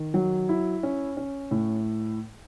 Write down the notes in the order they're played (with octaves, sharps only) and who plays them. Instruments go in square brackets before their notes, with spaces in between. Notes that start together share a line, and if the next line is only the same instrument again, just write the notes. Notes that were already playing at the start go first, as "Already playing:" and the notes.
Already playing: [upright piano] D#3
F#3
E4
C#4
C#4
A2